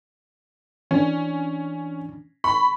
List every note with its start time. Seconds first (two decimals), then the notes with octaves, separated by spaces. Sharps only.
0.91 E3 C#4 D4
2.44 B5 C#6